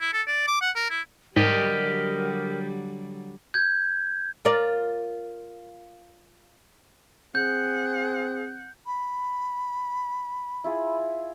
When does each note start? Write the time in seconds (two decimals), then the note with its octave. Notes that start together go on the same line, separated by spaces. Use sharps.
0.01 E4
0.13 A4
0.27 D5
0.47 D6
0.61 F#5
0.75 A#4
0.90 E4
1.36 G#2 D3 F#3 G3 G4 A#4 D5 D#5
3.54 G6 G#6
4.45 F4 A#4 D5
7.35 C4 G#4 F#5 G6
8.86 B5
10.64 E4 F4 G#4